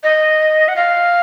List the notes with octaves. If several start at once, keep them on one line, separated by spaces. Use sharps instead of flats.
D#5
F#5
F5